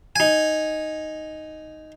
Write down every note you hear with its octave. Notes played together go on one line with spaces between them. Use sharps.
D#4 G#5